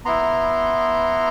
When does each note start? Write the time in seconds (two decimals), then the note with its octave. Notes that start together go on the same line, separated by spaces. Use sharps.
0.05 B3 E4 A#5 C6